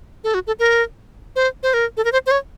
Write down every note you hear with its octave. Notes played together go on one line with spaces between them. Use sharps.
A4
F#4
A4
A#4
C5
C5
A#4
A4
A#4
C5
C5
C#5